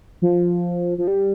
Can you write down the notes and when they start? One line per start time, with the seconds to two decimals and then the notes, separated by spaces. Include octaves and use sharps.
0.22 F3
0.98 F3
1.08 G3